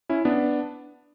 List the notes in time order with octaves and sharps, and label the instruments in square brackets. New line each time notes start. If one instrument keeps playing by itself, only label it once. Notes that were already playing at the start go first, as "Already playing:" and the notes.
[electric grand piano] C#4 E4
B3 D4